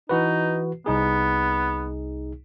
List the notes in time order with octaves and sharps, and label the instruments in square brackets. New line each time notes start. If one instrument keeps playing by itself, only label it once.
[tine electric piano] E3 F#4 B4 [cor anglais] D#4
[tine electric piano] C2 D#4 G#4 [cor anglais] B3